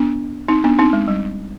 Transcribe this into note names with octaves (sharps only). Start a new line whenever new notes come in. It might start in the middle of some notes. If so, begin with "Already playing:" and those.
Already playing: B3 D4
C4 D#4
B3 D4
C4 D#4
G#3
G3